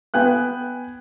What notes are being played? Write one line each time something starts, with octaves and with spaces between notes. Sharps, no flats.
B3 G5 G#5 F#6